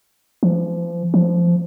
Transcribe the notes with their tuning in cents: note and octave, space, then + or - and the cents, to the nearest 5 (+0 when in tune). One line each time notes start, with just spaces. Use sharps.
F3 -35
F3 -15